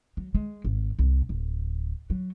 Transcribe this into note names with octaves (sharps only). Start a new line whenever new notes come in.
F#3
G#3
G#1
C2
D1
F#3